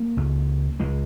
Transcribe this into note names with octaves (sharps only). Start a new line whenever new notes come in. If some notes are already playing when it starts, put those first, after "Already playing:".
Already playing: A#3
C#2 C#3
C#2 C#3 G#3